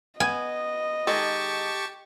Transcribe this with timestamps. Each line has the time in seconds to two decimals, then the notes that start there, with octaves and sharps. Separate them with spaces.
0.20 B3 D#5 G#5
1.07 D#3 G#3 G4 A4 A5 C#6